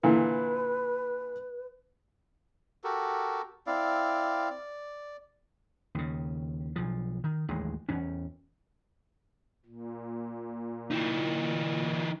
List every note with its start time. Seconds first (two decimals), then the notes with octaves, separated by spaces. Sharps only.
0.03 A#2 D3 E3 B4
2.84 F#4 G4 A4 A#4
3.67 C4 E4 D5 F5
4.50 D5
5.95 D#2 C#3
6.76 B1 F3
7.24 D#3
7.49 A1 D#2 G#3
7.89 E2 C#4
9.66 A#2
10.91 E3 D#4